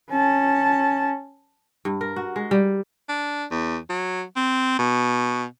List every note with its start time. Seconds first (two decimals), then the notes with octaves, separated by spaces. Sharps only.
0.11 C#4 A5
1.85 G2
2.01 A#4
2.16 F#4
2.36 G#3
2.51 G3
3.09 D4
3.51 E2
3.90 F#3
4.36 C4
4.79 B2